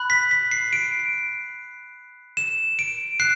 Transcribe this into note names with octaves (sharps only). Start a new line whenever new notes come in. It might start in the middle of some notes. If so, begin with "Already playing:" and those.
Already playing: B5 F#6
B6
B6
C7
D7
E7
D7
F#6 C7